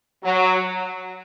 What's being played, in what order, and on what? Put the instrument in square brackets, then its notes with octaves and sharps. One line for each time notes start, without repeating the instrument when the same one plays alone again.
[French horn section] F#3